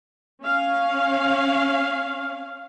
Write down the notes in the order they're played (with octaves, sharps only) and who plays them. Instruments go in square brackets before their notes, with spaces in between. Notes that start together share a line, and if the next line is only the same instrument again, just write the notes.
[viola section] C#4 F5